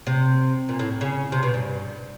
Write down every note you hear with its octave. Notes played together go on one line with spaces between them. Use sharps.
C3
A#2
A2
C#3
C3
B2
G2